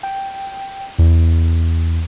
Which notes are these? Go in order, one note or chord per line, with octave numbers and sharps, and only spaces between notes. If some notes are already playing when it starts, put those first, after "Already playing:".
G5
E2